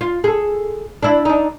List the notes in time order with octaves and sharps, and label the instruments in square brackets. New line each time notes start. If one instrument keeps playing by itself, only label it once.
[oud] F4
G#4 A4
D4 E4
D4 D#4